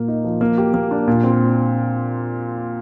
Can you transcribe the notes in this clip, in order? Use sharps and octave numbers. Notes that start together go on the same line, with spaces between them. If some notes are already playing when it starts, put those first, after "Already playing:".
Already playing: A#2 A#3
D#4
F3
A#3
G4
A#3
D4
A#2
C4